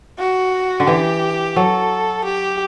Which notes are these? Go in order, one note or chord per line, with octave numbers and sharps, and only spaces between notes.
F#4
D3
E3 G4
F#3 A4
G4